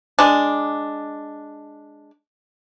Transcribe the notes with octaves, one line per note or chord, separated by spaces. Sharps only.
G#3 D4